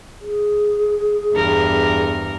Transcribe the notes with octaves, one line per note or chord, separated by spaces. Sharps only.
G#4
E2 G2 A#4